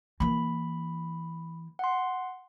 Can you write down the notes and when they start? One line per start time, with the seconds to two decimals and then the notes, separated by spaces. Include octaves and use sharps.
0.20 E3 A#3 B5
1.79 F#5 C6